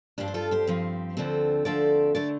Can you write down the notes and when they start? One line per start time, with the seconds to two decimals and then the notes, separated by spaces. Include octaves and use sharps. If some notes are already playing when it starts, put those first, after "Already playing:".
0.18 G2 F3 C4 D4 G4
0.28 C5
0.34 F4 A4
0.51 G4 C5
0.67 G2 F3 C4
1.17 D2 D3 F3 A3 C4
1.65 D2 D3 F3 A3 C4 A4 D5
2.15 D3 A3 A4 D5